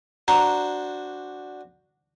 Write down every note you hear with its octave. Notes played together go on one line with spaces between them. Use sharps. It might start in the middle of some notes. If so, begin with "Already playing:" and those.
D4 F#4 C5 A#5